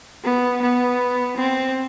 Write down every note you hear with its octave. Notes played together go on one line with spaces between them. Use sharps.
B3
B3
C4